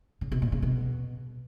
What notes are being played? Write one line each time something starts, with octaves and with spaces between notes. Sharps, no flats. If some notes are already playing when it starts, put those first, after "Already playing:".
C#3
B2
A#2
C#3
B2